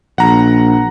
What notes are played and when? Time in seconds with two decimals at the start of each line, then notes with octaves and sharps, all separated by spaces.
0.18 A#1 F#5 A#5